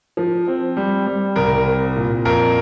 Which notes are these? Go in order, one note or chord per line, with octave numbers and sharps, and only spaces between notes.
F3
C4
G3
G3
C2 A#4
C4
A#2
F2 A#4